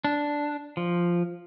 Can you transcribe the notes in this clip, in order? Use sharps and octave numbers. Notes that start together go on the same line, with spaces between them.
D4
F3